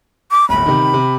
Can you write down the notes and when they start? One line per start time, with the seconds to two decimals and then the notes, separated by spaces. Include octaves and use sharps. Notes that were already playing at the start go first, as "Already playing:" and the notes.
0.31 D6
0.49 D1 G1 B5
0.66 C3 D#3
0.94 C3